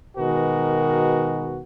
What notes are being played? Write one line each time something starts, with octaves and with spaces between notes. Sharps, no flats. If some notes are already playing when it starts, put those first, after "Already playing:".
B2 D#3 G#3 F#4 A#4 B4